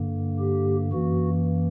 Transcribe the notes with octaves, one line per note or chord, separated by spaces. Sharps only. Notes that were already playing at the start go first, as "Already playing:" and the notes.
Already playing: G2 D3 A#3
G4
F#2 E3 A#3 F#4